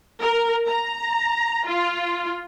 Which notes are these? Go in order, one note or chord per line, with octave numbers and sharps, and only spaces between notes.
A#4
A#5
F4